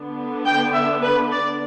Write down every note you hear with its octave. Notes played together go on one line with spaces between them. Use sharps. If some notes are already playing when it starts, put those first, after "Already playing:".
Already playing: D3 B3 D4
G5
E5
B4
D5